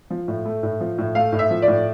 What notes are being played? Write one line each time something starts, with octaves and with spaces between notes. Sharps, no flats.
F3
A2
A3
A2
F3
A2
A3 F5
A2
E5
F3
D5
A2